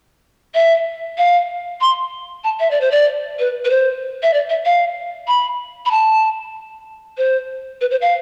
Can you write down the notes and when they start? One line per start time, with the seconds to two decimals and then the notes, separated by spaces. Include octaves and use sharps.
0.55 E5
1.18 F5
1.81 C6
2.44 A5
2.60 E5
2.71 D5
2.81 C5
2.91 D5
3.39 B4
3.65 B4
3.70 C5
4.23 E5
4.34 D5
4.49 E5
4.65 F5
5.28 B5
5.86 B5
5.91 A5
7.18 C5
7.81 B4
7.91 C5
8.02 F5